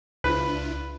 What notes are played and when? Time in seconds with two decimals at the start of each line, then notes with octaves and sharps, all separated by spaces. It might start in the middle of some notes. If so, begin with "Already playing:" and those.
0.24 C#2 D4 E4 F4 B4